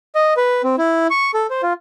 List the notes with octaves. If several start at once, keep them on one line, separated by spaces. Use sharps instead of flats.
D#5
B4
C4
E4
C#6
A4
C5
F4